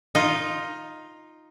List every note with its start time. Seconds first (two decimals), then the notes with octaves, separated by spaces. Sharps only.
0.15 D#4 F4